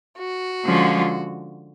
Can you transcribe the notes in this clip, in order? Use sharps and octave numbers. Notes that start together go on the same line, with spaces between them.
F#4
D3 F3 G#3 C#4 F4